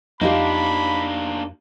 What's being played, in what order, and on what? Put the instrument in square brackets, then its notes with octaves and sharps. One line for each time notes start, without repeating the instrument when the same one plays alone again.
[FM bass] F2 [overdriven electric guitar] A#3 D4 [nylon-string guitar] D#4 F4 G4 [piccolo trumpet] B5